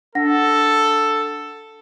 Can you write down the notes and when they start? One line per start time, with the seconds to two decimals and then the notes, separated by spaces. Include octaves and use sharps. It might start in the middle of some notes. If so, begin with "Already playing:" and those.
0.15 D4 A4 F#5 A#6